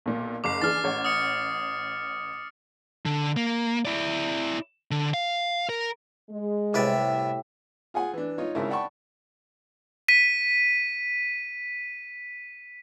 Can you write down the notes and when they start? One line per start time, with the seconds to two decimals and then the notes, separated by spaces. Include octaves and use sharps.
0.06 B1 A#2
0.44 F#1 D6 C7 F7
0.62 E3 D4 G#4 F6 A6
0.84 A1 C#5 F#5
1.05 D#6 C#7
3.05 D3
3.37 A#3
3.85 E4 D5
4.91 D3
5.14 F5
5.69 A#4
6.30 G#3
6.74 C2 A2 G4 B4 D5 E5
7.94 F4 G#4 F#5 G#5
8.13 E3 D4
8.38 D#4 F4 C#5
8.55 G#1 C#3 E4 A#4
8.70 D5 F#5 G5 A5 B5 C#6
10.08 B6 D#7